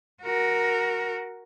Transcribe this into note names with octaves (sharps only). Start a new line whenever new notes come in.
F#4 A#4